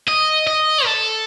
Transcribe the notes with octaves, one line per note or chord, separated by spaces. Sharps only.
D#5
D#5
A4